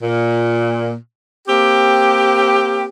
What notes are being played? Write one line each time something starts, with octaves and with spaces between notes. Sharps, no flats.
A#2
A#3 C4 G4